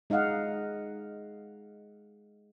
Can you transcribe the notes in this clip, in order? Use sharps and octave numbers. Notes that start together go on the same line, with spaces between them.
G#3 D#4 D#5 F5 F#5